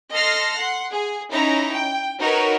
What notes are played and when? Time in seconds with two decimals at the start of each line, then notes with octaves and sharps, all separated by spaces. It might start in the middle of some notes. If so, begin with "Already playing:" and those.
0.12 A4 D#5 C6 F6 A#6 C7
0.55 F#5 C6
0.90 G#4
1.31 C#4 D#4 E4 A#5
1.73 G5
2.19 D#4 F#4 A#4 B4 C#5